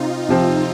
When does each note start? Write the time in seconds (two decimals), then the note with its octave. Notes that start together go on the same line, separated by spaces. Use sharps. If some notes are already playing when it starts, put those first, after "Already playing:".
Already playing: C3 C4 D#4 F4
0.29 C3 F3 C4